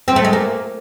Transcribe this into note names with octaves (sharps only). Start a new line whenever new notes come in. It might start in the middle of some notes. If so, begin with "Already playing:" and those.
C4
A3
G#3
A#3